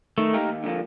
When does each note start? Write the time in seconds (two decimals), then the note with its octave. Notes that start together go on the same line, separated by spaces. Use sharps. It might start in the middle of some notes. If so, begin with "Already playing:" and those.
0.18 D#3 A3
0.33 A#3 D#4 G4 A#4
0.49 D#2
0.64 D3 F3 A#3